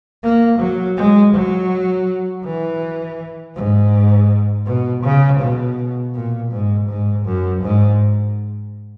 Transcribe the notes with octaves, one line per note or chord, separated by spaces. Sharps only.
A#3
F#3
G#3
F#3
E3
G#2
B2
C#3
B2
A#2
G#2
G#2
F#2
G#2